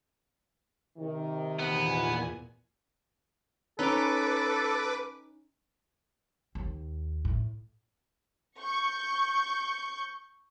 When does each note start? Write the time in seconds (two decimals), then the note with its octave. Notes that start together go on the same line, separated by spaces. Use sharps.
0.98 C3 D#3
1.60 E2 A#2 B3 G#5
3.79 C#4 D#4 A4 B4 D6
6.55 D#2
7.25 A2
8.60 C#6 G6